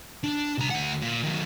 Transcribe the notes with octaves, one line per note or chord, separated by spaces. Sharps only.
D4
C2 A#5
D2 F#5
A#2
D#3 F#3